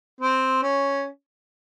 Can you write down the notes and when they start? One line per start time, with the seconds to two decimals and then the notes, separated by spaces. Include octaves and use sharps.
0.21 C4
0.63 C#4